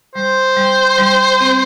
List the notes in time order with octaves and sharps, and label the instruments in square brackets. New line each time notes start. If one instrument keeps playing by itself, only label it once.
[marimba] G3 [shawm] C5
[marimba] G3
G3
C4